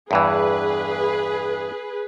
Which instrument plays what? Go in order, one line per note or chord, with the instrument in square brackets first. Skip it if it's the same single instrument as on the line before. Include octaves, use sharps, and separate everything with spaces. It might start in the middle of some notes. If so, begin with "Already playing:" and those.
[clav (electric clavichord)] E2 G2 E3 [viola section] G#4 B4